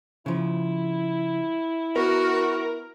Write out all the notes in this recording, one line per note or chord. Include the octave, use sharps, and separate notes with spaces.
C#3 F3 E4
B3 F#4 A#4